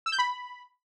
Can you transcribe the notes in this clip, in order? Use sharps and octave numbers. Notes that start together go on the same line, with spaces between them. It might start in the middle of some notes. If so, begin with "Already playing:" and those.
E6
G6
B5